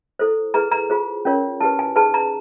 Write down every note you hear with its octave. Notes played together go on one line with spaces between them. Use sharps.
E4 A4 C5
E4 G#4 B4 A#5
A#5
F4 G#4 C5
C#4 F4 A#4 C#5
E4 G4 B4 A5
G#5
D#4 G#4 B4 A5
A#5